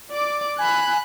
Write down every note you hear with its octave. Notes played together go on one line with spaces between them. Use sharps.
D5 D6
G#5 B5 F#6